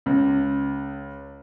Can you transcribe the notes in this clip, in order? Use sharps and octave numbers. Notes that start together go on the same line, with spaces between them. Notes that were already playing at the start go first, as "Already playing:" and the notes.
C#2